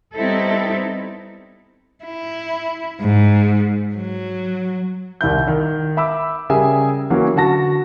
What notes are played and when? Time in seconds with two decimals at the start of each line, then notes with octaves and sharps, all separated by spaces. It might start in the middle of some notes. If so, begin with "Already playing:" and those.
0.15 G3 B3 C4 D#4 E4 A4
2.04 E4
3.01 G#2
3.95 F#3
5.21 C2 D#3 E4 G6
5.48 D#3
5.97 E5 B5 D6 E6
6.50 C#3 G3 G#4 A#4 E5 G#5
7.10 E3 F#3 A#3 C#4
7.36 D3 F#4 A5 A#6